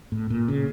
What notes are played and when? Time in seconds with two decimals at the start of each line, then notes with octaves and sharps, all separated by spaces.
0.12 A2
0.30 A#2
0.48 C#3